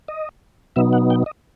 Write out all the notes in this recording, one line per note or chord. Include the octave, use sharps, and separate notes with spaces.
D#5
B2 F#3 B3 D#4 E5
F#5
G5
D#5